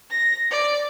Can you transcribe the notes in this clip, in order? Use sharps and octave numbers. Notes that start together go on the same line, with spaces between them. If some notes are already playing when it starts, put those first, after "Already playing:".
A#6
D5